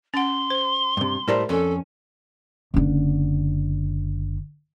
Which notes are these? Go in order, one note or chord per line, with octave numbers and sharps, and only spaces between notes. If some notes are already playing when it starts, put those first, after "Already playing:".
C#4 F#5 C6
C5
G2 C3
A2 G3 A#4 C5 D5 A#5
F2 C#4 A4
F#1 D3